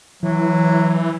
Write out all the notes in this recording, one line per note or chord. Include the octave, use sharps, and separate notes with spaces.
E3 F#3